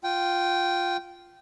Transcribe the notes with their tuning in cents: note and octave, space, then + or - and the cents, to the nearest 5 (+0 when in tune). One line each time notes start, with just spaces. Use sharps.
F4 +0 G5 -15